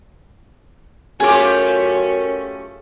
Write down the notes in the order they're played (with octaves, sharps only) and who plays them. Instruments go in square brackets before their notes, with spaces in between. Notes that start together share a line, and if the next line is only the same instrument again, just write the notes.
[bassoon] F#2 [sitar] A3 F4 G4 [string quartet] C#4 [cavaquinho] G#4 D6